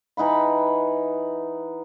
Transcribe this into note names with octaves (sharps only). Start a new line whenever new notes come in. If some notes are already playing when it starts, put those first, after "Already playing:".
E3 D#4 F#5 B5